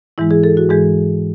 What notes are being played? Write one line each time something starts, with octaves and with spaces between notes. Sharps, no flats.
G#2 E3 G#3 E4
G#4
A4
F#4
G#2 E3 G#3 G#4